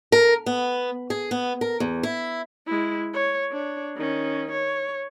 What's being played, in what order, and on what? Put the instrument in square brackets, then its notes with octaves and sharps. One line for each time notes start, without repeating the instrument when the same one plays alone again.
[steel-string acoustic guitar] A#4
B3
G#4
B3
A#4
E2
E4
[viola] G#3 E4
C#5
D4 C#5
D#3 C#4
C#5